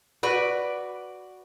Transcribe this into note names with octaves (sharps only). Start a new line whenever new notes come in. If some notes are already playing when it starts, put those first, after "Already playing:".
F#4 B4 D5